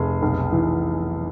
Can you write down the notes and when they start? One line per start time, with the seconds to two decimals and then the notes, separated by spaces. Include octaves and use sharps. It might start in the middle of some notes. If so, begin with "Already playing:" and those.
Already playing: F1 G#4
0.22 B1
0.52 E3